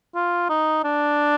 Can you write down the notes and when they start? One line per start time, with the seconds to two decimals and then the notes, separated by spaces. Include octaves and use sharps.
0.15 F4
0.49 D#4
0.84 D4